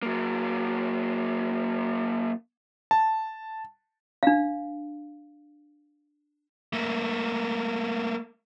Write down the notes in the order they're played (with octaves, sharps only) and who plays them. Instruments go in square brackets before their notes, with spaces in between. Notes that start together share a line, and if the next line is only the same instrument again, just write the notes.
[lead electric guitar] F#3 A#3
[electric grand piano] A5
[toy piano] D4 F5
[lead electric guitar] A3 A#3